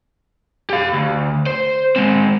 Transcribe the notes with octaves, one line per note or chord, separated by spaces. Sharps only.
G4 F5
D2
C5
G#3 C4